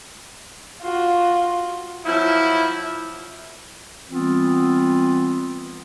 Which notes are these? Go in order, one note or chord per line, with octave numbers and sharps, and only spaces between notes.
F4 F#4
F3 F#3 E4
E3 G3 B3 C4 F4